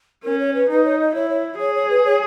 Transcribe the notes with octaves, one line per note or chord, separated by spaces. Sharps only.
C#4 A#4
C#5
B4
D#4 B4
C#5
D#5
E4 C#5
C#5
G#4 C#5
C#5
B4
C#5